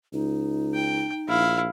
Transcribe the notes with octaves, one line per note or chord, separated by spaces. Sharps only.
C#2 D#4
G5
A#1 E4 F5